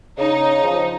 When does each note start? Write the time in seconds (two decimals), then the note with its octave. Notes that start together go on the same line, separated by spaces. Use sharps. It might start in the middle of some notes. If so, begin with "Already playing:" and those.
0.18 C#3 D#4
0.64 F3